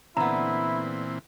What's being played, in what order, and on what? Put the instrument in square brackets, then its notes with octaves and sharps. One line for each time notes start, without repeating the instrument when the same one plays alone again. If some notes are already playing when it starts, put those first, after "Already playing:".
[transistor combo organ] A#2 E3 C4 [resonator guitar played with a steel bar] D3 B3 [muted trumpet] E4 [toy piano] A#5